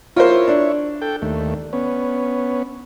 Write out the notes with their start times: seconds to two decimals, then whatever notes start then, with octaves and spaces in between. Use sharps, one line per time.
0.16 E4 F4 A#4 C5 C#5
0.48 D4
1.02 A4 G5
1.22 D#2 A3
1.73 B3 C#4